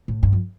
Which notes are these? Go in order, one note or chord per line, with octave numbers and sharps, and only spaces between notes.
A2
G2
F2